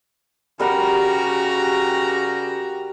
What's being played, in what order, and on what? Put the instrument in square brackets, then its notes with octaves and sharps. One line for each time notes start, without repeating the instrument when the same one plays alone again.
[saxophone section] C#3 G4 [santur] G3 A#4 F#5 [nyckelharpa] F#4 A#5